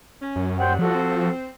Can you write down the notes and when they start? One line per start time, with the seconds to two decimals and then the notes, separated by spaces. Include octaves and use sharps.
0.20 C#4
0.36 F#2
0.58 A#2 F#3 G3 C5 F#5 G5
0.79 F3 F#4 A4
0.92 C4